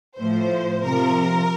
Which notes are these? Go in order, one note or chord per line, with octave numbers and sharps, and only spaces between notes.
A2 F3 C5
C3 F3 A#4